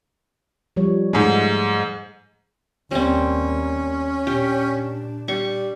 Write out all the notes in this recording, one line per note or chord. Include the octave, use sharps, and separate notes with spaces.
F3 G3 C#5
G#2 G#3 A3 D#4
D#2 G3 A#3 C4 C#4
A#2 D4 G4
G3 C#6